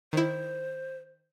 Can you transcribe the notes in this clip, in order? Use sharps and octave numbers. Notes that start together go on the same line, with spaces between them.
D#3 E4 C5